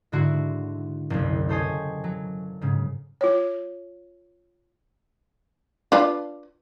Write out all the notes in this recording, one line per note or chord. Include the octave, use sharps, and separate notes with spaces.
G#2 D3 E4 F#4 C6
F#1 C2
G4 A4 C5 C#5 D#5 G#5
F#3
G#2 C#3
F4 C#5
D4 F4 B4